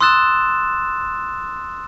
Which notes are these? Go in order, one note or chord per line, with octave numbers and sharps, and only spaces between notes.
C6 D#6 E6 F#6 A6 E7